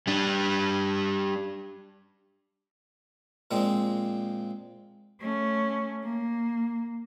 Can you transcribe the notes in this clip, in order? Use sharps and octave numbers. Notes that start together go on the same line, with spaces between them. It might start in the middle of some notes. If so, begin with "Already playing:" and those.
G3 D4
A#2 F3 G#3 C4
A3 C#4
A#3